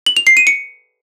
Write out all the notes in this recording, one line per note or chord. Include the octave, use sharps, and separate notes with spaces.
F#7
F7
C7
D#7
C#7